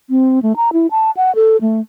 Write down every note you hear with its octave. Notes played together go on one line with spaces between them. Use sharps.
C4
A3
A#5
E4
A5
F#5
A4
A3